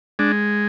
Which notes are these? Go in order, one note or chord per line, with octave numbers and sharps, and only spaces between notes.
G#3 D4